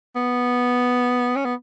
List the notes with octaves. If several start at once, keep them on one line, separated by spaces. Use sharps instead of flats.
B3
C#4
B3